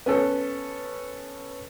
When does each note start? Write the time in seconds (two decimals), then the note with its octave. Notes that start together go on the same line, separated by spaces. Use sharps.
0.06 B3 C#4 A4